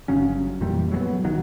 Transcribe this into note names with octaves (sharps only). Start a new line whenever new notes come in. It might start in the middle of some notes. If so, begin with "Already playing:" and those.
G1 C#3 F#3 C#4
F2 A#2 E3 G3
F#3 G#3 B3
C2 D#3 F#3